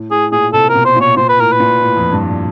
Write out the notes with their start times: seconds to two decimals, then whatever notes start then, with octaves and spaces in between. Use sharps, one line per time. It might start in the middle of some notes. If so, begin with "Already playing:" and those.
Already playing: A2
0.11 A2 G#4
0.32 A#2 G#4
0.53 C3 A4
0.69 A#4
0.75 B2
0.85 C5
0.96 A#2 C#5
1.16 A#2 C5
1.29 B4
1.39 A2 A#4
1.52 B4
1.60 A#2
1.81 A2
1.96 F2
2.12 G2